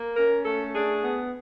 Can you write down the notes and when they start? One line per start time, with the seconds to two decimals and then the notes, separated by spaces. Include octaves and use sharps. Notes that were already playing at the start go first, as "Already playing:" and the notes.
Already playing: A#3
0.16 C#4 A#4
0.45 A3 A4
0.74 D4 G#4
1.03 B3